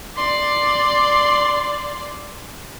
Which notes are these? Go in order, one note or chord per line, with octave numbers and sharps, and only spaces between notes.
D5 C6